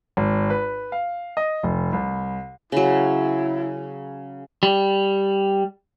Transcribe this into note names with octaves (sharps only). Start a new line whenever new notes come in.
G#1
B4
F5
D#5
F1
C2
C#3 F#3 E4
G3